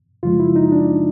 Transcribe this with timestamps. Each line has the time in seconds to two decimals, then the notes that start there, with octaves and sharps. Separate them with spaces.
0.23 F#2 C#3 F3 G#3 F4
0.40 E4
0.56 D#4
0.72 D4